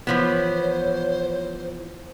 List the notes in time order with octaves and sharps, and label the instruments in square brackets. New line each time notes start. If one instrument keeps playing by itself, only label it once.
[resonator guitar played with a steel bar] E3 F3 B3 [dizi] C5 [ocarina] C#5